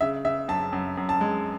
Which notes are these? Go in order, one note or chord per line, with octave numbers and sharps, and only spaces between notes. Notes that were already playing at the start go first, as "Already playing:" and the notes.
C#3 E5
C#3 E5
F#2 A5
F#2
F#2
A5
G#3